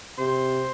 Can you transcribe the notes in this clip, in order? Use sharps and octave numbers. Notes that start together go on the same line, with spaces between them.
C3 C5